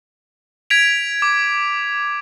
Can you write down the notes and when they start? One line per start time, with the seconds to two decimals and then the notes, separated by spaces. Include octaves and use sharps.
0.70 G#6 B6 D7 F7
1.22 D6